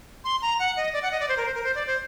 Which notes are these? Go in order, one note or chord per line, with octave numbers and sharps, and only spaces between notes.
C6
A#5
F#5
D#5
D5
F#5
D#5
D5
C5
A#4
C5
A#4
C5
D5
C5